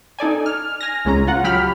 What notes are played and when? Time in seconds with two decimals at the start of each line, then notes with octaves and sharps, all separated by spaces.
0.19 D#4 A4 D5 G#5
0.46 F6
0.81 G#5 F6 A#6
1.05 C#2 G#3 C#4 A#5
1.27 F4 F#5
1.44 F#3 G4 B5 F6